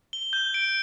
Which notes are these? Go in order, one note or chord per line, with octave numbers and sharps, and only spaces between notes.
G7
G6
D7